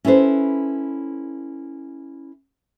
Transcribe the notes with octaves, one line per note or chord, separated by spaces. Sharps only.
C#4 E4 A4 B4 C5